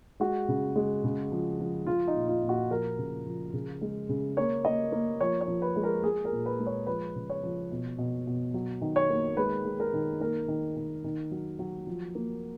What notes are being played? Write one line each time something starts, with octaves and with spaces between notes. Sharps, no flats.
G#3 F#4
C#3
G#3
C#3
F3
F3
F3 F4
D#4
A#2
F4
A#2
F#4
F3 A#4
C#3
F3
C#3
G#3
C#3
A#3 C#5
A#3 D#5
A#3
F3 C#5
C#5
F3
B4
G#3
A#4
G#3 G#4
A#4
A#2
B4
G#3
C#5
F3 B4
C#3
C#5
F3
B2
B2
B2
F#3
D#3
C#5
A#3
G#3 B4
G#3
A#4
D#3
A#3 A#4
D#3
D#3
D#3
F#3
F#3
F3
A#3